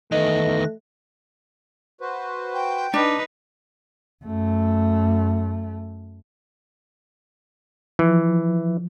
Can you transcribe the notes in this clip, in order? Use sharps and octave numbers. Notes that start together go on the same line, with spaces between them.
E2 D#3 A3 B4 D#5 A#6
F#4 B4 C5
G5
D4 D#4 B4
F#2 A3
E3 F3